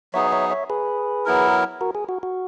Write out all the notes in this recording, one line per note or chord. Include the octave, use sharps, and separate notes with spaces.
F#3 B3 D#4 G#4 C#5 E5
C#5 E5
C#5 E5
G#4 B4
F#3 B3 E4 A#4
F#4 A#4
G#4
F#4
F#4